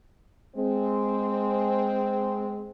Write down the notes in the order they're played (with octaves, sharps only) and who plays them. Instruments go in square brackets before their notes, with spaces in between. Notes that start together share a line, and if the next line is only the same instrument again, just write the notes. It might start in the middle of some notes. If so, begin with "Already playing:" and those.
[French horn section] G#3 C4